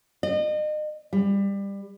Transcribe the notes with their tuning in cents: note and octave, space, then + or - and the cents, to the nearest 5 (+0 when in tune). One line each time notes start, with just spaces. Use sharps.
D#5 -35
G3 +20